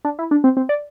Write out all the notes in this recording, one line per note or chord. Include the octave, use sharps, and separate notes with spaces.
D4
E4
D4
C4
C4
D5